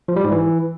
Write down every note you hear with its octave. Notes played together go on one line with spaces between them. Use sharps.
F3
G3
G#2
E3